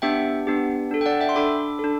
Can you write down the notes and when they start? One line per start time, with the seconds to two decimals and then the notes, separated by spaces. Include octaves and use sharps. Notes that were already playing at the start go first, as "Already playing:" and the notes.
0.02 B3 D4 G4 E5 G5
0.47 B3 D4 G4
0.91 D4 A4
1.01 G5
1.06 D5 F#5
1.20 E5 G5
1.29 C6
1.35 D4 A4 B5 D6
1.79 D4 A4